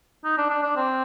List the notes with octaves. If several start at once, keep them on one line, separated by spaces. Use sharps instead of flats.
D#4
D4
D4
D4
C4